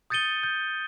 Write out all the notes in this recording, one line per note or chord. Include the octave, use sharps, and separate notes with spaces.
D#6 G6 A6 C#7 D#7 G7
G6